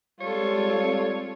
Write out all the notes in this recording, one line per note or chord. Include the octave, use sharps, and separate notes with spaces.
G3 G#3 C4 F4 A4 C#5